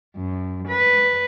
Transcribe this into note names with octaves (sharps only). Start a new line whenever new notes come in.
F#2
B4